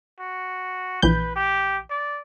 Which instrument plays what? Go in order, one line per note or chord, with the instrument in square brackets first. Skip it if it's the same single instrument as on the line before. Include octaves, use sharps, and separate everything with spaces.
[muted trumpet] F#4
[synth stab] A#1 E3 G6 [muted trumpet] B4
[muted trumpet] G4
D5